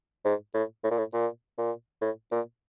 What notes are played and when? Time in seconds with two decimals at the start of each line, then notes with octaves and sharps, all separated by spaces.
0.25 G#2
0.54 A2
0.84 A2
0.91 A#2
0.98 A2
1.14 A#2
1.58 A#2
2.01 A2
2.31 A#2